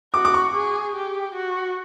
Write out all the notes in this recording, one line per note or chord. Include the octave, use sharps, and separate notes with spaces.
F#4 D6
D6
C#6
G#4
G4
F#4